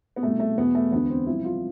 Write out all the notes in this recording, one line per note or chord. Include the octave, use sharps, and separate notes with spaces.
B3
C2 B2 A3
A3
E2 B2 B3
A3
E1 D2 D3 B3
C4
C2 C3 F3 E4
F4